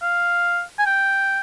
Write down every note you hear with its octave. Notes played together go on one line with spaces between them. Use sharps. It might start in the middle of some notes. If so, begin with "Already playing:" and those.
F5
G#5
G5